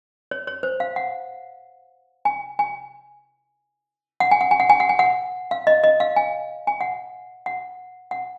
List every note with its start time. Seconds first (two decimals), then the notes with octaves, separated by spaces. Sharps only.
0.31 C#5
0.47 C#5
0.63 C5
0.80 F5
0.96 F#5
2.25 G#5
2.59 G#5
4.20 F#5
4.31 G#5
4.41 F#5
4.51 G#5
4.60 F#5
4.70 G#5
4.80 F#5
4.89 G#5
4.99 F#5
5.51 F5
5.67 D#5
5.84 D#5
6.00 F5
6.16 G#5
6.67 G#5
6.81 F#5
7.46 F#5
8.11 F#5